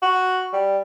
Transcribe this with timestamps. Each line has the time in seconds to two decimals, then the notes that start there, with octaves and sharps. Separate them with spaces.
0.02 F#4
0.53 G3